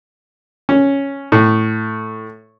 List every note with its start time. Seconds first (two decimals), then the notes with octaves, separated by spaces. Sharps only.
0.69 C#4
1.32 A2